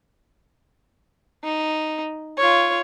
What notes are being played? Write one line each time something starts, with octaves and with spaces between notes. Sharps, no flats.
D#4
F4 C#5